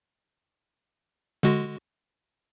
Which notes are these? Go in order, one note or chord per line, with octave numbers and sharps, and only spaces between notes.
D3 G#3 F#4